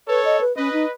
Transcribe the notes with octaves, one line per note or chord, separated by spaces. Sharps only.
A4 B4 C#5
D#5
B4
C#4 B4 D#5
D#4